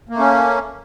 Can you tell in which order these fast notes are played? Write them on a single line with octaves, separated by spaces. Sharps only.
A#3 A3 C#4